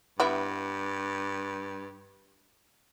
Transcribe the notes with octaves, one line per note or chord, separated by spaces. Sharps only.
G2 G3 B3 E4